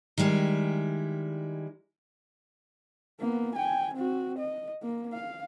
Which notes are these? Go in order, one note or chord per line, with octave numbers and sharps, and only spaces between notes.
D#3 G3 G#3 E4
A#3 B3
G5 G#5
C4 F#4
D#5
A#3
F5